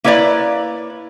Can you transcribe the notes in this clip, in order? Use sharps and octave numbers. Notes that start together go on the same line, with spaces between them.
A#3 E4 B4 C#5 D5